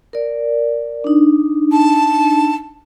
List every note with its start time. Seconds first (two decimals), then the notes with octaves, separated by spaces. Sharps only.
0.13 A#4 D5
1.04 D4 D#4
1.72 A5